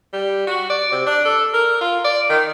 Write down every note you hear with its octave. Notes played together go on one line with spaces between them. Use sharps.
G3
F#4
D5
C3
D4
A4
A#4
F4
D5
D#3